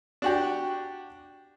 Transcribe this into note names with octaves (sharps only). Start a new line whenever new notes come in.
D4 F#4 G4